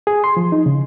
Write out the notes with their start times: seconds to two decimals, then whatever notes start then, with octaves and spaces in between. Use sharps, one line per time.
0.07 G#4
0.24 C6
0.37 F3
0.52 D#4
0.66 C#3